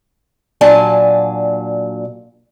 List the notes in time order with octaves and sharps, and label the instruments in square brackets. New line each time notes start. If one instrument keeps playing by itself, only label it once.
[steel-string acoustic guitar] A#2 F#3 D4 G#5 A5